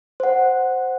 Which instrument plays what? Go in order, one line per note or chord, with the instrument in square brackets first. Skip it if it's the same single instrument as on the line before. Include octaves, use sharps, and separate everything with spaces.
[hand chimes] C5 F#5